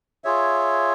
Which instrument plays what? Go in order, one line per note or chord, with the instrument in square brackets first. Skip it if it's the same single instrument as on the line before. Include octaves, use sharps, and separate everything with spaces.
[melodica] F4 G#4 C#5 E5